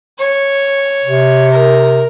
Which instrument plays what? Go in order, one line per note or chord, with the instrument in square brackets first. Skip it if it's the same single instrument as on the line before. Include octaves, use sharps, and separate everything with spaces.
[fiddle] C#5
[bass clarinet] C3
[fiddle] A#4